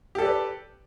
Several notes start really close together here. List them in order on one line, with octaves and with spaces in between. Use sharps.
G4 A4 D5 B4